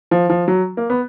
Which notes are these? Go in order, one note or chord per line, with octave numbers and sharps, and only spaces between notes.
F3
F3
F#3
A#3
B3